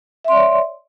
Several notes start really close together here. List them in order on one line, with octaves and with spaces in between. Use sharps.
E5 C6 D5 C#5